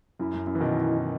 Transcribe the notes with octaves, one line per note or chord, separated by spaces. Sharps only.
F#2 E4
F#2
F#2
E3
B2 D#3